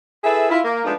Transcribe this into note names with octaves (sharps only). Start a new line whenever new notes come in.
E4 G#4 A4 B4 E5
E4 F4
A#3
F3 G#3 A3 B3 D4 D#4